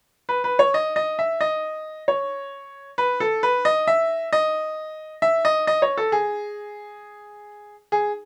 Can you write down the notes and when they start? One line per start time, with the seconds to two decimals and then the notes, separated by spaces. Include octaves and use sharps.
0.29 B4
0.44 B4
0.59 C#5
0.74 D#5
0.96 D#5
1.19 E5
1.41 D#5
2.08 C#5
2.98 B4
3.20 A4
3.43 B4
3.65 D#5
3.87 E5
4.33 D#5
5.22 E5
5.45 D#5
5.67 D#5
5.82 C#5
5.98 A4
6.12 G#4
7.92 G#4